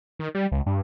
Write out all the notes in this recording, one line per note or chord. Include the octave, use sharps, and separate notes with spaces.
D#3
G3
C#2
G2